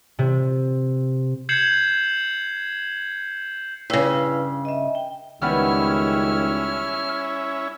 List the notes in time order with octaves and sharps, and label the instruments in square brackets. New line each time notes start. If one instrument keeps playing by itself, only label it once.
[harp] C3
[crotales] G6 G#6 C7 C#7 E7 F#7
[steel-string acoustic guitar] G2 C#3 [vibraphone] E4 B4
[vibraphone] D#5 E5
G5
[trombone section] C#2 D#3 [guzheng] G3 B3 [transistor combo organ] C#4 E4 [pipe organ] F6